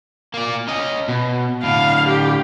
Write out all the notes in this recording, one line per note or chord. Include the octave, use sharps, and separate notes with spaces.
A#3 D5
C#4 D#5
B2
A2 D3 F5
G4